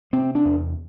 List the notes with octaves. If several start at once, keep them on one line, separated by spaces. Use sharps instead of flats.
C3 C4
D4
E2